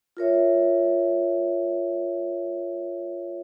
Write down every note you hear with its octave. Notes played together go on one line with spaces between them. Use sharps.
F4 A#4 C#5 E5